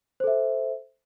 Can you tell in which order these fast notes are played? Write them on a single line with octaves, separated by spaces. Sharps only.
C5 A4 E5